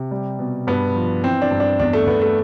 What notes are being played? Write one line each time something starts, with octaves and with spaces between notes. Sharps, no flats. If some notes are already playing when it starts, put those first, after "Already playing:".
Already playing: C3
G3
B2
G2 B3
F3
E3 C4
D4
G2
D4
E2 D4
A3
E2 B3
A3